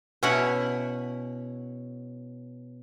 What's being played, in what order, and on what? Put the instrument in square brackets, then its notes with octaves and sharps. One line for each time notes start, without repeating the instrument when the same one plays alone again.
[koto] B2 C#4 E4 C#5 F#5